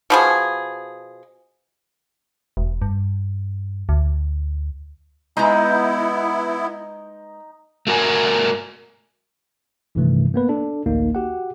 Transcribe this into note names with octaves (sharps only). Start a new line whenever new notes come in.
B2 F3 G#4
E1
G2
D2
G#3 B3 D#4 E4 B4 A#5
A3 F#4 A#4 G#5
A#1 G2 C3 D#3 E3 A3
A#3 B3 B4
D4 A4
A1 D2 A#3 D#4
F#4 G4 F#5